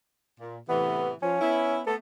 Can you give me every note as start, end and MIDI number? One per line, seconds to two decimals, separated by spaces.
0.40 0.58 46
0.69 1.14 45
0.69 1.14 48
0.69 1.14 52
0.69 1.09 59
1.22 1.39 53
1.22 1.81 61
1.41 1.81 59
1.41 1.81 64
1.87 1.96 57
1.87 1.96 59
1.87 1.95 69